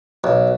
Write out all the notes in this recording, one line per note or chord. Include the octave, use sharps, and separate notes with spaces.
B1